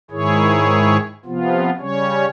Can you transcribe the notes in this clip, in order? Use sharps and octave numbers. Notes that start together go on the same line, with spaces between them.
G#2 D#3 E4 G#4 C#5
C3 F3 B3 F4
C#3 G3 C#4 C#5